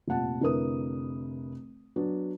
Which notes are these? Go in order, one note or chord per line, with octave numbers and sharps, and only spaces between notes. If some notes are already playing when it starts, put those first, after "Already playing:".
F1 A#2 F#5 A5
F1 D3 E4 A#4 B4 D#6
F#3 B3 D4